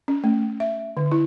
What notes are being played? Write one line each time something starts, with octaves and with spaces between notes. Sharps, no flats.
C#4
A3
E5
D3
E4